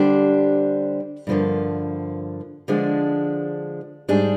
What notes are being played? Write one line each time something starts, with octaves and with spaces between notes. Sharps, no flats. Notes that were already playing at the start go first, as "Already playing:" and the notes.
Already playing: D3 G3 D4 G4 C5
G2 D3 F3 A#3
D3 F3 G#3 D4
G#2 G3 D4 G#4